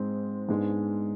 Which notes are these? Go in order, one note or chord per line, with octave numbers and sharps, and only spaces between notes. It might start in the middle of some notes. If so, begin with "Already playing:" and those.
Already playing: G#2 G#3 C4
G#2 G#3 B3 D4